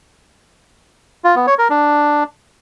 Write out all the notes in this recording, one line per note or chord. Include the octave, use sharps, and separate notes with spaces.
F4
B3
C#5
A#4
D4